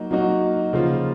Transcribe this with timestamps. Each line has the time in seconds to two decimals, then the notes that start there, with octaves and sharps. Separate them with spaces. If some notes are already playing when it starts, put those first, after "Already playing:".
Already playing: F#3 A#3 D#4 F#4
0.11 F#3 A#3 D#4 F#4
0.73 C#3 F3 A#3 F4